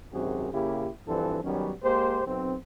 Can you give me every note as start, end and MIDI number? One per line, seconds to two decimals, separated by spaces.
0.13 0.52 32
0.13 0.52 42
0.13 0.52 48
0.13 0.52 60
0.13 0.52 66
0.13 0.52 68
0.53 0.89 49
0.53 0.89 58
0.53 0.89 64
0.53 0.89 67
1.08 1.39 43
1.08 1.39 52
1.08 1.39 53
1.08 1.39 60
1.08 1.39 62
1.08 1.39 69
1.44 1.71 51
1.44 1.71 54
1.44 1.71 55
1.44 1.71 59
1.44 1.71 61
1.83 2.23 56
1.83 2.23 58
1.83 2.23 67
1.83 2.23 72
2.26 2.55 35
2.26 2.55 60